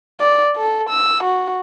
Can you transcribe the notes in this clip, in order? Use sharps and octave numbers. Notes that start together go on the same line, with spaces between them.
D5
A4
E6
F#4